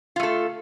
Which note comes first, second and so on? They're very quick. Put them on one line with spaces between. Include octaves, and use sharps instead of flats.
F4 A3 A4